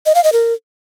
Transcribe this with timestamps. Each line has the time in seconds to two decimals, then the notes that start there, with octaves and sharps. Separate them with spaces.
0.06 D#5
0.15 F5
0.24 D#5
0.33 A#4